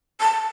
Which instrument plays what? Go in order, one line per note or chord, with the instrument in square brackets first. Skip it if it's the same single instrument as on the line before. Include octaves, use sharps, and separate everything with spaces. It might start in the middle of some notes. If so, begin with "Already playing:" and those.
[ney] A5